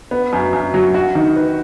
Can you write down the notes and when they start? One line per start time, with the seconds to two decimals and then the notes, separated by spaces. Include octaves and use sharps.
0.11 B3
0.33 F#2
0.53 F#2
0.74 F#3
0.94 F#4
1.15 D#3
1.36 B4